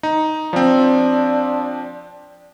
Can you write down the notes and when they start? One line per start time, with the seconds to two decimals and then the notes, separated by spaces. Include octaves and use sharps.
0.03 D#4
0.53 F3 C4 D4